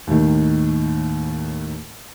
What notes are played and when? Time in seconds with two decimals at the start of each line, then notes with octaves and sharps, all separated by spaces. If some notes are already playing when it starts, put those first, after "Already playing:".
0.07 D#2 A2 D#3